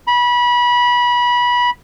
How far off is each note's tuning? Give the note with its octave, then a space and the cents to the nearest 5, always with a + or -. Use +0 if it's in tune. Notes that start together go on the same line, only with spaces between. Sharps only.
B5 -25